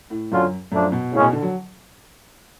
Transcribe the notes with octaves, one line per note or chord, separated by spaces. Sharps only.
A2
F#2 D3 F#3 C#4 F4
F#2 F3 A3 D4
B2
F#2 A2 C#3 G#3 C#4
B2
D3
F#3